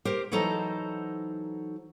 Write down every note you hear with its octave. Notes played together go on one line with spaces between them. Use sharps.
G4 A#4 C5
E3 F#3 D#4 A4 C5 A#5